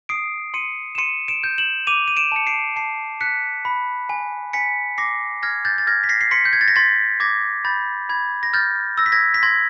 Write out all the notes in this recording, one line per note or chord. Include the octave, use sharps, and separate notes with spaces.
D#6 C7 D7
C6 C#7 D#7
E7
C6 C#7 D#7
D7 E7
G6
E7 F#7
D6 D#7 F7
D#7
D7 E7
A5 C#7
C7 D7
A5 C7 D7
F#6 B6 C#7
B5
G#5
G#5 B6 C#7
D6 A#6 C7
F6 G#6 A#6
G6 A6
A6
F6 G#6 A#6
B6
A#6 C7
C7
C6 B6 C#7
G6
G#6
A6
A#6
C6 A6 B6
D6 G#6 A#6
B5 G6 A6
B5 G#6
A#6
F6 G6 A6
E6 A#6
B6
G#6 A#6
B6
C6 G#6 A#6